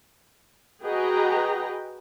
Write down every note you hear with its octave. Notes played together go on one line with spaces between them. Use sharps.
F#4 G#4 B4 D#5 G5 A#5